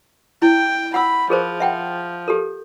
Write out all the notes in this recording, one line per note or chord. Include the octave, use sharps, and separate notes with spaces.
E4 G5
F#5 B5 E6
F3 G#4 A#4 C5
E5 F#5 G5
G4 A4 A#4